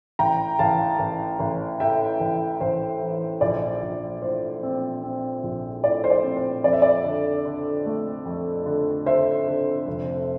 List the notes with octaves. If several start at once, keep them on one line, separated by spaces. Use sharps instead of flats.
A1 G5 A#5
A1 F5 A5
A1
A1
A2 E5 G5
A1
A1 C5
E3
A#1 D5
A#1
A2 C5
C4
C4
A#1
A2 D5
C5
D5
C4
C5
F2 D5
E5
D5
D3
D3
A3
F2
D3
D3 C5 E5
D3
F1